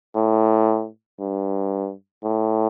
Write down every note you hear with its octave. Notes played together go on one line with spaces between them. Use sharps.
A2
G2
A2